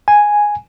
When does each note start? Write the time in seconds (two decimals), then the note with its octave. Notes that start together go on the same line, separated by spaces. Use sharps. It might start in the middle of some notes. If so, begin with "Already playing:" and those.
0.08 G#5